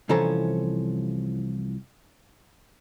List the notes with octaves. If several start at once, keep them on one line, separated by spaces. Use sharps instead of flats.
C2 E3 F3 C#4 A4 A#5